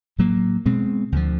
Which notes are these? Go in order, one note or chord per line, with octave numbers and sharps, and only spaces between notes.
A2 F#3 A#3
B2 G#3 C4
D2 D3 F3